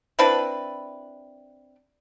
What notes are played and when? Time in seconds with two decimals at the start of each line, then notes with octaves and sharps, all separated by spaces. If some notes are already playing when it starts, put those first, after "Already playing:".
0.19 C4 D4 E4 B4